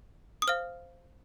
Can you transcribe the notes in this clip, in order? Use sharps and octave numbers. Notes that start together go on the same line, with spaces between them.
D#6
C5 F5 F6